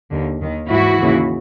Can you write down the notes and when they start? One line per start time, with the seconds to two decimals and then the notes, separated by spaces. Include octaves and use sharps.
0.11 D#2 D3
0.40 D#2 D#3
0.70 G#2 E3 E4 F#4
1.00 D#2 C#3 E3